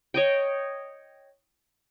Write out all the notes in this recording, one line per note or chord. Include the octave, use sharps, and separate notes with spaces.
C#5 D#5 G5